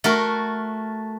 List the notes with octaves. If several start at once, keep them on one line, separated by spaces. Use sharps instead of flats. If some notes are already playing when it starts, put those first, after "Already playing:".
A3 F#4 A#4